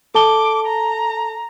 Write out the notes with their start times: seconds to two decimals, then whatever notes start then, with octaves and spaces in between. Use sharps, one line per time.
0.15 A4 A5 D6 G7
0.66 A#5